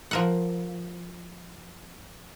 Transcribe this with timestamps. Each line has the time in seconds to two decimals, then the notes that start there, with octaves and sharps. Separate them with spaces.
0.11 F3 A#4 F#5